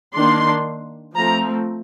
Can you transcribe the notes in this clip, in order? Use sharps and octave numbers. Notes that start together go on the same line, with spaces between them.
D#3 A#3 D4 C6
F3 A3 C4 A#5